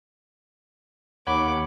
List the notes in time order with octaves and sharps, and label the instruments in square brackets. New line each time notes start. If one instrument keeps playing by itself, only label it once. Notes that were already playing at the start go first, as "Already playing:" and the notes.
[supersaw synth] D#2 [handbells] C#5 F#5 B5 [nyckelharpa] D6